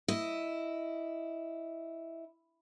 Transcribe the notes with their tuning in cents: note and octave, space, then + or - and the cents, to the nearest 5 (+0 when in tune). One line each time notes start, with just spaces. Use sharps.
E4 +0 D#5 +0